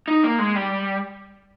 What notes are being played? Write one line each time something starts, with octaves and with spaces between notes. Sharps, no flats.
D#4
A#3
G#3
G3